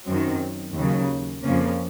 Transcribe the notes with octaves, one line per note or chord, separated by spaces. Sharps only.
F#2 D#3 F#3 C4
D#2 C#3 F#3
F2 C#3 F3 A#3 C#4